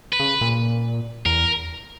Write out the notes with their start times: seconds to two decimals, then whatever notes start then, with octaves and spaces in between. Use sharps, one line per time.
0.13 B4
0.20 C#3
0.41 A#2
1.25 E2 A#4